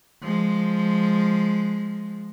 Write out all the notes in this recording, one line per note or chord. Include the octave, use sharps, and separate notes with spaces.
F3 G#3